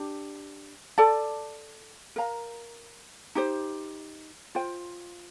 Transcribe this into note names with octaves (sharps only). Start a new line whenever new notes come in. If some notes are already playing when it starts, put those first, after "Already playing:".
Already playing: D4 G4
A4 D5 A5
A#4 F5 A#5
D#4 G4 C5
F4 C5 G5